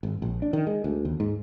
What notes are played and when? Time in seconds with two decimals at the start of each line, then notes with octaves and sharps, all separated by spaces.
0.03 G#1
0.22 A#1
0.42 D4
0.53 D#3
0.67 G#3
0.84 D2
1.05 D#2
1.20 G#2